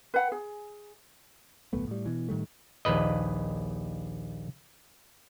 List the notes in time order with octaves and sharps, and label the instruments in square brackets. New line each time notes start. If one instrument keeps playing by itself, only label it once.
[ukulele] B4 F#5 G5
G#4
[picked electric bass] D1 B1 A3 B3
A2 G3
B2 E3
A2 D#3 G3 A3
[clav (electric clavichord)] A#1 D#2 B4 D#5